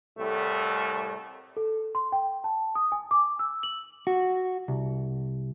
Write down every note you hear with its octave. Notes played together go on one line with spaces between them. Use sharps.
C2 A2 A3
A4
C6
G5
A5
D#6
G#5
D6
E6
F#7
F#4
C2